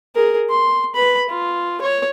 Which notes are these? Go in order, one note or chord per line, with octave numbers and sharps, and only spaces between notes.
G#4 A#4
C6
B4 B5
F4
C#5